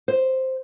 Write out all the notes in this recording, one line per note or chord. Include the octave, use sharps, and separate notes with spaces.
C5